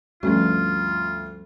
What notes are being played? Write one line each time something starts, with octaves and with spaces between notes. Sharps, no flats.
D2 G2 F3 A3 C#4 F4